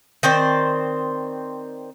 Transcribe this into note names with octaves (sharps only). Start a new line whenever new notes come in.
D#3 C4 C5 D5